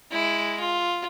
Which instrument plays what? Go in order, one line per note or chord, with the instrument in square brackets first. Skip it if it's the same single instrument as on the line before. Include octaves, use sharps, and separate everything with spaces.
[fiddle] G#3 E4
F4